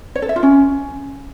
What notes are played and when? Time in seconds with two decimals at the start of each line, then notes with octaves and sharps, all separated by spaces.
0.15 C#5
0.22 A4
0.29 E5
0.36 F4
0.43 C#4